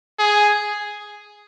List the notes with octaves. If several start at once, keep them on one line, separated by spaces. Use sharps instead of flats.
G#4